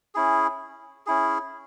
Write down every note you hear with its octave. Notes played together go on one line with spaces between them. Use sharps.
C#4 E4 G#4
C#4 E4 G#4